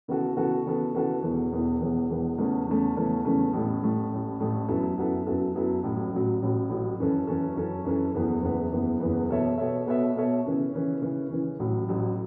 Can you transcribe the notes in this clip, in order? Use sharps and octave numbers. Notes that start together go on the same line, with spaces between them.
C#3 E3 B3 F#4 A4
C#3 E3 B3 F#4 A4
C#3 E3 B3 F#4 A4
C#3 E3 B3 F#4 A4
E1 E2 E3
E1 E2 E3
E1 E2 E3
E1 E2 E3
E2 C#3 E3 A3 C#4
E2 C#3 E3 A3 C#4
E2 C#3 E3 A3 C#4
E2 C#3 E3 A3 C#4
A1 A2 A3
A1 A2 A3
A1 A2 A3
A1 A2 A3
F#2 F#3 B3 E4 A4
F#2 F#3 B3 E4 A4
F#2 F#3 B3 E4 A4
F#2 F#3 B3 E4 A4
A1 A2 F#3
A1 A2 F#3
A1 A2 F#3
A1 A2 F#3
F#2 E3 C#4 A4
F#2 E3 C#4 A4
F#2 E3 C#4 A4
F#2 E3 C#4 A4
F#1 E2 E3 B3
F#1 E2 E3 B3
F#1 E2 E3 B3
F#1 E2 E3 B3
B2 B3 A4 C#5 E5
B2 B3 A4 C#5 E5
B2 B3 A4 C#5 E5
B2 B3 A4 C#5 E5
C#3 E3 C#4
C#3 E3 C#4
C#3 E3 C#4
C#3 E3 C#4
A1 A2 F#3
A1 A2 F#3